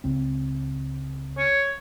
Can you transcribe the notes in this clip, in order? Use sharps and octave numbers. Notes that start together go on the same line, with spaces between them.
C#2 C#3 C4
C#5